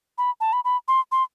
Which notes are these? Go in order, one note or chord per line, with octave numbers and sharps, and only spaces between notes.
B5
A5
B5
B5
C6
C6